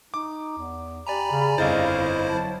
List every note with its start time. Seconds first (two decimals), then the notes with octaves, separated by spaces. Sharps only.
0.14 D#4 D6
0.58 E2
1.07 G4 D5 G#5 A#5 B5
1.31 C#3
1.58 G1 F2 E4 C5 D#5 F5 A6
2.28 F#3 A5